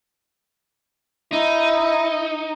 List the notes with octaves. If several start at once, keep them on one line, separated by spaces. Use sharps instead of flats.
D#4 E4